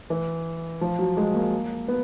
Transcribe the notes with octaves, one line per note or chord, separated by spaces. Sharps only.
E3
F3
F#3
G#3
A#3
B3